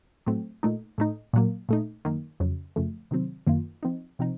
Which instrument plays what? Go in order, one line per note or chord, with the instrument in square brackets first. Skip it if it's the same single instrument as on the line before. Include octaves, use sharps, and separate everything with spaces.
[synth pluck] A2 F#3 A3 C4
A#2 A3 D#4
A2 A3 D#4
A#2 F#3 A#3
A#2 A3 D#4
F#2 D#3 A#3
F2 C#3 F#3
F#2 C#3 F3 A3
C3 D#3 F#3 C4
F#2 D#3 A#3 F4
F3 C4 D#4
C3 F3 C4 D#4